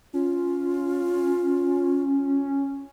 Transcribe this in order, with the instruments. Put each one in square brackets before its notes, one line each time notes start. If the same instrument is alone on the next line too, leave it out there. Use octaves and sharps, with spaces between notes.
[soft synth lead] C#4 [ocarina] F4